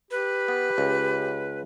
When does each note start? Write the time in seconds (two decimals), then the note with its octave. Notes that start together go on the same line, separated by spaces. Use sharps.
0.11 G4 B4
0.48 B3
0.78 C#2